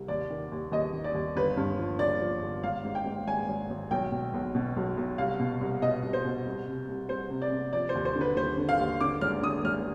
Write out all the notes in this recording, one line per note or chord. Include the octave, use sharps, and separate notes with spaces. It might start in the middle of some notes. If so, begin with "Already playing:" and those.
Already playing: C2
D#2 D5
D#3
D#2
D#2 D#5
D#3
D5
D#2
G1 B4
G2
F3
G1 D5
F3
G1
G#1 F5
G#2
G5
G#2
G#1 G#5
G#1
G#1
B1 G5
B2
B1
B2
B1
B1
C2 F5
B2
C2
B2 D#5
C2
C5
B2
C2
C3
C2
C2 C5
C3
D5
C3
F3 D5
C5
D#2
C5
D3
B4
D#2 C5
D3
F5
D#2
D3 D6
G#1 F6
D3 D#6
G#1 F6